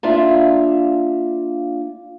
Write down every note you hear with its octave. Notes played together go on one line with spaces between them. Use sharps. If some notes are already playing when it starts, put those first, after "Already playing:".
A#3 D4 F4 D5 E5 F5